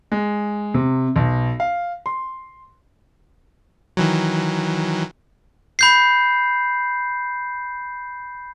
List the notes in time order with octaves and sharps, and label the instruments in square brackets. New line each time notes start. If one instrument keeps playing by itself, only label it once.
[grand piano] G#3
C3
B1
F5
C6
[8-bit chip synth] D#3 E3 F#3
[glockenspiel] B5 G6 C7